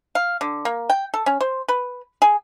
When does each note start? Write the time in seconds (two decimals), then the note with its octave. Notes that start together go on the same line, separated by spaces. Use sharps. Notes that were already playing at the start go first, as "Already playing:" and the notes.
0.15 F5
0.41 D3
0.65 A#3
0.90 G5
1.14 A4
1.26 C#4
1.40 C5
1.68 B4
2.22 G#4